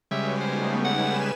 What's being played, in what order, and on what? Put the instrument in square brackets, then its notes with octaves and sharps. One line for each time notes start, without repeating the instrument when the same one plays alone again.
[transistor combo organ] C#3 G3 G#3 [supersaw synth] F#4 B4 C#5 [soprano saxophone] E5
[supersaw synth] A3 B3 D#4 [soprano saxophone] C5
[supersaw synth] B4 G#5 E7 [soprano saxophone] F#5